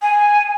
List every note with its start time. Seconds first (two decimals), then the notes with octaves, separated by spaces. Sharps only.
0.02 G#5